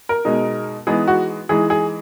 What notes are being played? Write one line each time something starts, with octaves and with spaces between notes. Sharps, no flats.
A#4
B2 G#3 D#4
E3 G#3 B3 D#4 G#4
F#4
E3 G#3 D#4 G#4
G#4